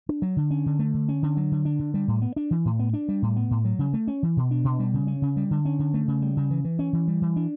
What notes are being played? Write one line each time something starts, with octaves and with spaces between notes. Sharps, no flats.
D4
F#3
D3
C#4
D3
A3
D3
C#4
D3
F#3
D3
D4
D3
G3
A2
B3
D4
E3
A2
B3
D4
G3
A2
B3
A2
F#3
C#3
A3
C#4
E3
B2
D4
B2
G3
C#3
C#4
C#3
G3
D3
C#4
D3
A3
C#3
G3
C#3
E3
E3
C#4
E3
G3
E3
D4